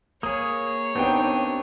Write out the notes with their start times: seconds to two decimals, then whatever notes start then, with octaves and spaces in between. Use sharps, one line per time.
0.23 A#3 G#4 C#5 D#6
0.95 D#2 B3 C4 D4 D#4 G5